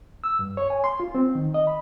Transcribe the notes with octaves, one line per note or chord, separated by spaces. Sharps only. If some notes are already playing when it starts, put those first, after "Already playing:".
E6
G2
C#5
G#5
C6
F4
C4
D#3
D#5
B5